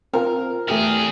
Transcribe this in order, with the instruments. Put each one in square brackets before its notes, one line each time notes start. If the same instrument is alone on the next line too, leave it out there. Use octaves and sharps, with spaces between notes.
[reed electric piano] C4 F4 [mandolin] A#4
[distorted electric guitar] E2 G#4 [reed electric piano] A3 G4 F6